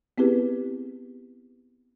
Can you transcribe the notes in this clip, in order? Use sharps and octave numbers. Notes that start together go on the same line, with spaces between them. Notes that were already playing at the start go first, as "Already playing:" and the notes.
B3 C4 E4 G4 G#4 B4